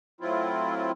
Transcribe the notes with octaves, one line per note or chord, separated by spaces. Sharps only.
A2 F#3 C4 E4 F4